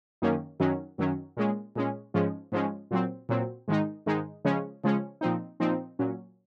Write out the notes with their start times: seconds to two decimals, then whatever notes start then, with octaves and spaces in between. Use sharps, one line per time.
0.22 F#2 D#3 A#3 C#4
0.60 F#2 D#3 F#3 C#4
0.98 F#2 D#3 F#3 C#4
1.37 A#2 G#3 C#4
1.76 A#2 G#3 C#4
2.14 G#2 F3 G#3 C#4
2.52 G#2 F3 G#3 C#4
2.91 A#2 F#3 C4
3.29 A#2 F#3 C4
3.68 G#2 D#3 G#3 D#4
4.06 G#2 D#3 G#3 D#4
4.45 C#3 F3 G#3 C#4
4.84 C#3 F3 G#3 C#4
5.21 A#2 F3 C4 D#4
5.60 A#2 F3 C4 D#4
5.99 A#2 F#3 C#4